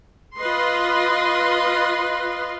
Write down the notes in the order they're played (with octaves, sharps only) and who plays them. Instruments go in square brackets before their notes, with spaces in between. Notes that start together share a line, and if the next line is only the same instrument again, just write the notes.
[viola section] F4 B4 D#5 C6